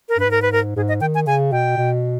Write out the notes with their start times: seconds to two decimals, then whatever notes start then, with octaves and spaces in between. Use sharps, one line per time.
0.09 A#4
0.17 G2 B4
0.26 G#2
0.31 A#4
0.42 B4
0.52 A#4
0.76 G#2 G#4
0.88 D#5
1.01 D#3 G5
1.15 G#5
1.27 C#3 G#5
1.52 B2 G5
1.78 B2